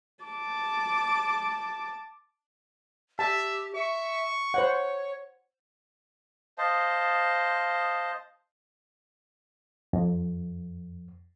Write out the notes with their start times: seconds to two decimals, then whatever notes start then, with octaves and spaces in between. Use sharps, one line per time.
0.24 A5 D6
3.19 G4 E5 A5
3.75 E5 C#6
4.54 C5 C#5 F#5
6.58 C5 D#5 F5 A5
9.93 F2